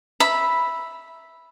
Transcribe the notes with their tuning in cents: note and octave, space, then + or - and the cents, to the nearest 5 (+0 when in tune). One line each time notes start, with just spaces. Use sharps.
E5 +0 B5 -5